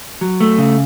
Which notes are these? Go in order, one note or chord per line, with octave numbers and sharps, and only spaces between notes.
F#3
A3
C#3